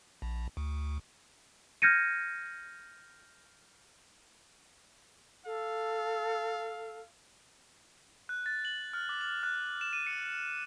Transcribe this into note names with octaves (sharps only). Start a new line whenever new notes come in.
A#1
D2
F6 G6 G#6 A#6 C#7 D#7
A4 F5
F#6
A6
F#7
F6
D6
F#7
F#6
E7
D#7
C#7